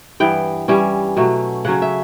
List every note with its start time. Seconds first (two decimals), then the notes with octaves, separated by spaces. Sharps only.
0.20 G2 E3 B3 G5
0.68 E3 G3 C#4
1.17 B2 F#3 A3 C#4
1.65 C#3 F#3 C#4 F#5
1.82 E5